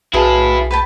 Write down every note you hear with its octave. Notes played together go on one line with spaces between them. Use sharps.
B1 E4 F#4 G#4 B4 F5 A5 C6
B4 G5 A5